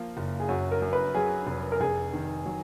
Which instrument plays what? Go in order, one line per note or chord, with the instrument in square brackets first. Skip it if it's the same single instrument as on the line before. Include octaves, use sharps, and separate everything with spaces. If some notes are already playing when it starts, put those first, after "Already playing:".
Already playing: [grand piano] F3 A#3 [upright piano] F4
[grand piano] F#1
[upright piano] G#4
[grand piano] F#2 [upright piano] F#4
[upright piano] A#4
[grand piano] F#2
[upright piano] B4
[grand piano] F#3 [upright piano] G#4
[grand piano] F1
[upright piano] A#4
[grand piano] F1 [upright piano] G#4
[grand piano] D#3
F#3